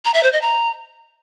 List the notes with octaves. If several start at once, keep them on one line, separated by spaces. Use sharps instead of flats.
A#5
E5
C5
D#5
A#5